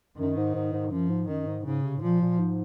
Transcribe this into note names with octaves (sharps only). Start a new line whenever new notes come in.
F#2 D#3
G#2
G#2
G#2
F#2 F3
G#2
F#2 D#3
G#2
G#2 C#3
C3
G#2
A#2 F3
A#2
G#2